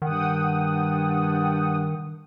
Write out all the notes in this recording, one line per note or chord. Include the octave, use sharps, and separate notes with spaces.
G2 D#3 F#5 G5 D#6